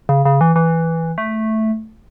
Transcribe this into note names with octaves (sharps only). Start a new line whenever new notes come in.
C#3
C#3
E3
E3
A3